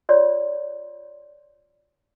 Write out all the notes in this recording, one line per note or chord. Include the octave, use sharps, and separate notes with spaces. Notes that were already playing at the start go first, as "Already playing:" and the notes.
F4 C#5 D5 C6